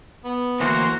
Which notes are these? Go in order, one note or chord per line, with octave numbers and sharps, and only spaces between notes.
B3
D2 E3 A#3 F#4 C5